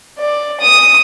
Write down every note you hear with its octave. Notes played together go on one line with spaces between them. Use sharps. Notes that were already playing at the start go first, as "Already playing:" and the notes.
D5
D#6